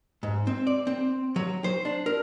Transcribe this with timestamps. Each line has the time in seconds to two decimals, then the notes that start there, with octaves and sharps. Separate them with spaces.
0.23 G#2
0.47 C4
0.67 D5
0.87 C4
1.36 F#3
1.64 C5
1.85 D4
2.06 A#4